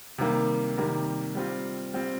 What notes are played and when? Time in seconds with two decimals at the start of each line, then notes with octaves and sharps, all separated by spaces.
0.18 C3 D#3 G3 A#3
0.78 C3 D#3 G3 A#3
1.35 G3 C4 F4
1.94 G3 C4 F4